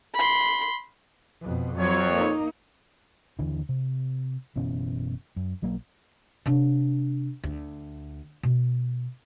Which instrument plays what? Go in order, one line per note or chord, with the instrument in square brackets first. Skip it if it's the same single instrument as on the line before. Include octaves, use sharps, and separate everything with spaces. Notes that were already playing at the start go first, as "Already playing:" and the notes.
[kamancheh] B5 C6
[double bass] F2 B2
[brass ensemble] F2 C#5 [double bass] F#3
[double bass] A#3 D#4
[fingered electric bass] D#2 D3 E3 D4
C3
F#1 B2 E3 C#4
F#2
B1 F#3 A#3
[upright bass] C3 D4
D2
B2